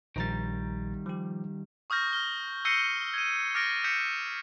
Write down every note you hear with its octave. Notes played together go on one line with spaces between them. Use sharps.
A#1 D#3 G3 A#5 A6
F3 G4
C#6 D#6 F6 G6 A#6
F6 G7
E6 G6 A#6 C7 C#7 D#7
G#6 D#7
D6 F6 A6 A#6 D7
D#6 G6 B6 C#7 E7